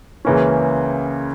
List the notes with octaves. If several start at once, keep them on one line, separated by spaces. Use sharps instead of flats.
C#2 C#3 E3 A#3 C#4